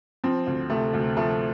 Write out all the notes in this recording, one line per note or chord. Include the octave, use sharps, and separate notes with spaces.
F3 C4
D2
C3 A3
D2
F3 A3